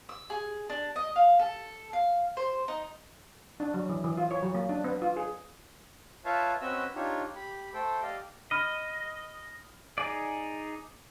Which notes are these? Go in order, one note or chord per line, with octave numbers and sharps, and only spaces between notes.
E6
G#4
D4
D#5
F5
A4
F5
C5
D#4
D4
F#3
E3
E3
F4
C#5
F#3
A#3
D4
B3
F4
G#4
F4 B4 C#5 E5 F5 A5
C4 C#4 F#4 B4 D#5 E6
D4 D#4 F4 G4 C#5
G4 B5
A3 A4 C5 G5
G4 D5 D#5 F5
D#5 B5 F6 D#7
D#4 G#4 D5